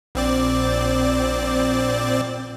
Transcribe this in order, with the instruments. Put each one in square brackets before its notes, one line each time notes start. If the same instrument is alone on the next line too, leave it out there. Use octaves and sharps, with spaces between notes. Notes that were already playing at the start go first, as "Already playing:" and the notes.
[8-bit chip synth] A#1 C4 D5